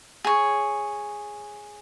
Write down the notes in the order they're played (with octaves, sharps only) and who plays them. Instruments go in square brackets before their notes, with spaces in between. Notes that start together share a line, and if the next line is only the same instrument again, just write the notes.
[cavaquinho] G#4 C#5